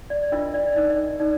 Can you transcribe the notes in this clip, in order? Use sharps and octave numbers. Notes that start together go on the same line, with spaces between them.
D5
D4 F4 A#4 D#5
D5
D#4 A#4 D5
D#5
D#4 A#4 D5